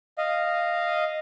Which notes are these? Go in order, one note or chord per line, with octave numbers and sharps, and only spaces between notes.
D#5 F5